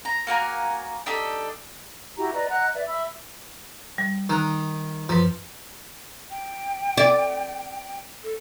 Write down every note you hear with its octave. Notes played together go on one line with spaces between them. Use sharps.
A#5
A#3 F#4 G#5 A#5
D4 D#4 G4 A4
E4 F#4 G4 A#5
B4 D5 D#5 A#5
D#5 F#5 A#5 F#6
B4 D5 E5
E5 B5 E6
G3
D#3 A#5 F#6
F#2 F3 B4
G5
D5
A4